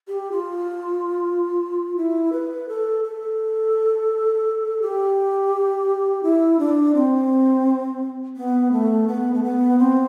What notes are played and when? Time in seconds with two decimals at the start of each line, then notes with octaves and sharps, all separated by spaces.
0.08 G4
0.32 F4
1.97 E4
2.32 B4
2.68 A4
3.04 A4
4.82 G4
6.23 E4
6.59 D4
6.95 C4
8.37 B3
8.72 A3
9.08 B3
9.34 A3
9.44 B3
9.79 C4